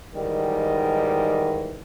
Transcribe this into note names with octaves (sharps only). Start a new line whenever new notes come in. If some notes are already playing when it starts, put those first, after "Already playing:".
G#2 D#3 E3 G3